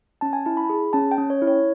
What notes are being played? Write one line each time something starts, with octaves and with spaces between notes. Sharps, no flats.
C#4 A5
G#5
E4 A5
B5
G#4
C#4 A5
G5
C#4
C#5
E4
C#5